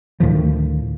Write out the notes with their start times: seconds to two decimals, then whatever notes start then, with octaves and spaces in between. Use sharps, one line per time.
0.20 D2 A2 D#3 F3